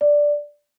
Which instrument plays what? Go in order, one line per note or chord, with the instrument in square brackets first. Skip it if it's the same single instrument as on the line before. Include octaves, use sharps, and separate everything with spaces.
[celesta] D5